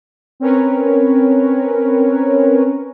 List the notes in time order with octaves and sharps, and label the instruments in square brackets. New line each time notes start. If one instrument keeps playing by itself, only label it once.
[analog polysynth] C4 C#4 A#4 B4 C#5